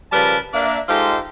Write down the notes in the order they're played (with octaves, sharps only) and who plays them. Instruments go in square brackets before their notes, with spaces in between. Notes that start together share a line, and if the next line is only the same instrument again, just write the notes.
[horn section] C#3 F3 G3 A#4 B4 A5
A#3 D4 E5
G#3 D#4 F4 G4 A4 C5